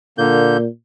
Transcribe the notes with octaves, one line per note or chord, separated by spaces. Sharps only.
A#2 D3 A#3 G6